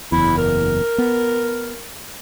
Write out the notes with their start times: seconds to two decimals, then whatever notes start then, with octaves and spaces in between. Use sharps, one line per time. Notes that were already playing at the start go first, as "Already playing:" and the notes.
0.12 F#1 E2 E4
0.38 A#4
0.98 B3